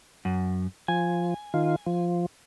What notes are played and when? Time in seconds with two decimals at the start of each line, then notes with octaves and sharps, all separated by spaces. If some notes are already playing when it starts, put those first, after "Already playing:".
0.25 F#2
0.88 F3 G#5
1.54 D#3 F4
1.86 F3